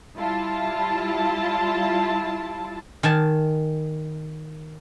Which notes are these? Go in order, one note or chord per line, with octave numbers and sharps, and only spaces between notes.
G3 E4 F4 A5
D#3 G#5 A5